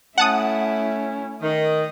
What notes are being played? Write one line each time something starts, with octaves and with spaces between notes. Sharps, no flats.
A3 C#4 E4 F#5 A5 D#6
D#3 D#5